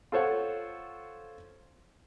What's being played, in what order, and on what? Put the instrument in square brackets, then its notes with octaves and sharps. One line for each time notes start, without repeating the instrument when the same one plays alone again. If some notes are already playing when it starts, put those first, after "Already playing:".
[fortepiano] F4 A4 C5 C#5 F#5